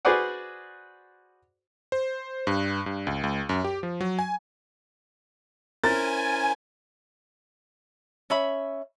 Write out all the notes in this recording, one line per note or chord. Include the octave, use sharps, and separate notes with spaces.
F#4 G#4 B4 C5 D5 F#5
C5
G2
G2
C#2
C#2
F#2
G4
F3
F#3
G#5
C#4 E4 A#4 C5 G#5 A6
C#4 E5 B5